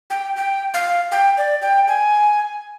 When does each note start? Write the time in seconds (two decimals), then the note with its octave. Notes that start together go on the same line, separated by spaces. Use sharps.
0.10 G5
0.36 G5
0.74 F5
1.12 G5
1.38 D5
1.62 G5
1.88 G#5